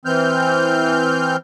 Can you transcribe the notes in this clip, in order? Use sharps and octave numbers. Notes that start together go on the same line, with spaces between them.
E3 C4 F6 G6